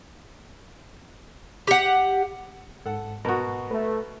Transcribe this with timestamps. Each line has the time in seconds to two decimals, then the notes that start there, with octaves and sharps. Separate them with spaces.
1.67 G4 F#5
2.86 G#2 A4 F#5
3.25 B2 F#4 A#4 D#6
3.71 A3 B4